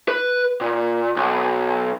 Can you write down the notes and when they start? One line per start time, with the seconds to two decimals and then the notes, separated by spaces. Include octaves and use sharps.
0.08 B4
0.61 A#2
1.16 B1